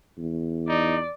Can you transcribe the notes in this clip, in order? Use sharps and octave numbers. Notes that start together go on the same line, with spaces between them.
E2
D#4 D5